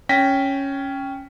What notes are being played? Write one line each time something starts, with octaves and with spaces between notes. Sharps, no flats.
C#4 G5 A#6 B6